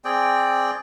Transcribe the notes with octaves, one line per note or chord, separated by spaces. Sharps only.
C4 G#4 D5 G5